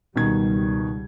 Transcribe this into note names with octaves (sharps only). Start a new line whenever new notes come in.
C#2 B2 D#3 G3 G#6